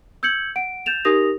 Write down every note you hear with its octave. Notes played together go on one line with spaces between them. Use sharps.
E6 G6 G#6 C#7 F#7
F#5 D7
G6 A6 E7 F7
D#4 G4 A#4 D#6 A#6 F7